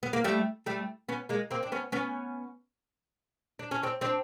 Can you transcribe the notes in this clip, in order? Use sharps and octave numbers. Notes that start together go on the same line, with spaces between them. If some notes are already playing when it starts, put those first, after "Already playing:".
B3
A#3
G3 A3
G3 A3
B3 C#4
G#3 A#3
A#3 C4
D4
B3 C#4
B3 C#4
D4
C#4
C4 D4
C4 D4